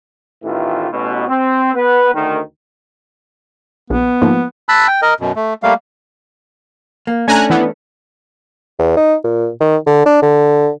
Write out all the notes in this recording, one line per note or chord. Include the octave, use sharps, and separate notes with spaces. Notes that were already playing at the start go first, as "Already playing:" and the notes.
A1 A2 D#3 E3 F4
A1 B2
C4
B3 B4
D2 D#3
A#1 B3
G#2 F3 A#3
A5 B5 E6 F#6
G5
A#4 D#5
F#2 B2
A3
G3 A3 A#3 F5
A#3
A3 C#4 D4 G#5 A#5 F#6
E3 B3
E2
D#4
A#2
D#3
D3
D4
D3